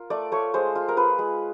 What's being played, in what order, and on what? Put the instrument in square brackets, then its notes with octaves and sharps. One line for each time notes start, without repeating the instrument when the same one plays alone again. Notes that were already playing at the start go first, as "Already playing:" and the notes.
Already playing: [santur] F4 A#4
A3 D5
A3 C#5
G#3 C5
F4
A#4
F4 B4
G#3